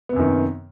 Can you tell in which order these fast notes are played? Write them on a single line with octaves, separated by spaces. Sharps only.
B3 C3 F#2 D#3